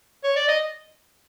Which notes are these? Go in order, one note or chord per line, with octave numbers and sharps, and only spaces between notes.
C#5
D5
D#5